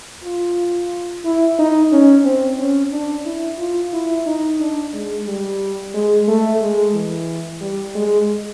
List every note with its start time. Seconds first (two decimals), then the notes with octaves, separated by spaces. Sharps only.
0.24 F4
1.25 E4
1.59 D#4
1.92 C#4
2.25 C4
2.59 C#4
2.93 D4
3.26 E4
3.59 F4
3.93 E4
4.27 D#4
4.60 D4
4.93 G#3
5.28 G3
5.94 G#3
6.28 A3
6.62 G#3
6.95 E3
7.61 G3
7.95 G#3